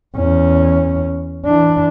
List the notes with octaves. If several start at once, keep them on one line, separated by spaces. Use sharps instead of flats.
E2 C#4
E3 D4